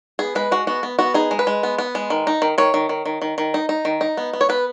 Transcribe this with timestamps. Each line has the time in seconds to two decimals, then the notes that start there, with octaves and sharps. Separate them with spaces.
0.19 B3 G#4
0.35 G#3 B4
0.51 G#3 F#4
0.67 B3 F#4
0.83 B3
0.99 B3 F#4
1.14 D#4 G#4
1.31 G#3
1.39 B4
1.47 G#3
1.63 B3
1.78 B3
1.95 G#3
2.10 D#3
2.27 D#4
2.42 D#3
2.58 D#3 C#5
2.74 D#3
2.89 D#3
3.06 D#3
3.22 D#3
3.38 D#3
3.54 D#4
3.69 D#4
3.85 D#3
4.01 D#4
4.17 B3
4.33 B3
4.41 C#5
4.49 B3 B4